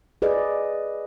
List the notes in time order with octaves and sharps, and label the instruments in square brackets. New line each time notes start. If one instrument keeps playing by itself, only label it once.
[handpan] G#4 B4 D5 D#5